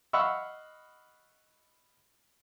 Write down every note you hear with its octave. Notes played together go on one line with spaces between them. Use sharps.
D#5 F5 F#5 B5 C#6 E6